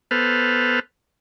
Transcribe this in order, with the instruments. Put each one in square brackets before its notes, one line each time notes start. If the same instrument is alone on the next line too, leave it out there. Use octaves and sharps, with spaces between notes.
[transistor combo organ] B3 A4 B4 C5 F6